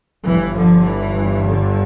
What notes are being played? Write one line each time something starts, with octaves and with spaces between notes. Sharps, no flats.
G1 G2 E3
D3 F3
E3
D3